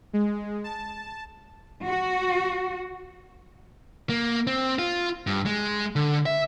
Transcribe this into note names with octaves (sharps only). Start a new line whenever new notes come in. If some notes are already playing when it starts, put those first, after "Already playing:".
G#3
A5
F#4
A#3
C4
F4
G2
G#3
D3
E5